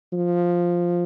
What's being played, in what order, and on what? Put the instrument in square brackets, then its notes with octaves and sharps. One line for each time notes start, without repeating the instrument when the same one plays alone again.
[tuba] F3